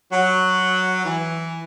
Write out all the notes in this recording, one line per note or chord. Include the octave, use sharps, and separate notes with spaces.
F#3
E3